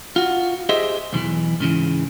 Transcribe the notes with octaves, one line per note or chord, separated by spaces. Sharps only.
F4 F#4
G4 G#4 C5 D#5 E5
B1 E2 D#3 E3
G#2 C#3 E3